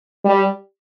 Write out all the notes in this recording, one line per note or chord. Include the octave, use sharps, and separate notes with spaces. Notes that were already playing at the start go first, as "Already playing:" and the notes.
G3